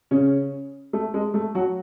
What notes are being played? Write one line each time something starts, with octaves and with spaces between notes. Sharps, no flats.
C#3 C#4
A3
G#3
A3
F#3 F#4